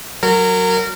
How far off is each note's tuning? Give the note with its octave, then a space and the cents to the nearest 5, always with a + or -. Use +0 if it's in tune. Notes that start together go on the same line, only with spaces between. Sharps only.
F#3 +0 A#4 -25